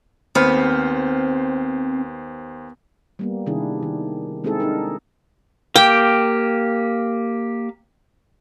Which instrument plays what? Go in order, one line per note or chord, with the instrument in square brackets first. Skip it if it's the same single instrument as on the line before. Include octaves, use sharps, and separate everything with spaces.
[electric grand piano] D#2 C5 F6 [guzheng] B3 [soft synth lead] C4
[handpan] G3 A#3 B3
C3 D#3 D4 E4 G#4
D#3
G#3 C4 D#4 E4 G#4 A4
D4 D#4 A#4
[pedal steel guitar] A#3 G4 [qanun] G5